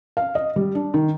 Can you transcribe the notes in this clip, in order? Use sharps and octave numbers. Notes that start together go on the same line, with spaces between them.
F5
D#5
G3
D4
D#3